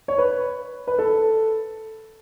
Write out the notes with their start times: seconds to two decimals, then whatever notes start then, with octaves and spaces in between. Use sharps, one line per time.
0.08 C#5
0.18 B4
0.87 B4
0.99 A4